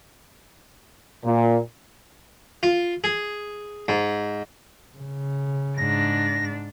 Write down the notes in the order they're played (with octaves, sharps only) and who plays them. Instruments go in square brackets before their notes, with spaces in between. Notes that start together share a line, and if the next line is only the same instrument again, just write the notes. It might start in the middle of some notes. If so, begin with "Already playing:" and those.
[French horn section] A#2
[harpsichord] F4
G#4
G#2
[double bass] C#3
[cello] G#2 D4 [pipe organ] A#6